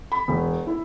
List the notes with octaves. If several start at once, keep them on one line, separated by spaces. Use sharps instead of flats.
B5
E1
E4